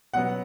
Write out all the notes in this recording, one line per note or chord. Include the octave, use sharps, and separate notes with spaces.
B2 F#3 B3 F#5